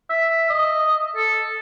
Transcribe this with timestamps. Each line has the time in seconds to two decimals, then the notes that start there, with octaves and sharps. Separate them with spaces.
0.10 E5
0.50 D#5
1.16 A4